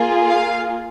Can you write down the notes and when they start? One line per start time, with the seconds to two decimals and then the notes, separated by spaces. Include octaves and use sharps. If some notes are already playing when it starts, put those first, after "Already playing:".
Already playing: A#3 F4 G#4
0.28 F5